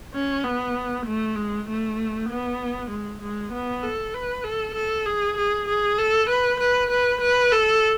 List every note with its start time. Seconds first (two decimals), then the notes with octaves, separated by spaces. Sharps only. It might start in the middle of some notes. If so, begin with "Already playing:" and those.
0.14 C#4
0.44 B3
1.06 A3
1.36 G#3
1.68 A3
2.29 B3
2.91 G#3
3.22 G#3
3.53 B3
3.83 A4
4.14 B4
4.44 A4
4.75 A4
5.06 G#4
5.38 G#4
5.68 G#4
5.98 A4
6.30 B4
6.60 B4
6.91 B4
7.21 B4
7.52 A4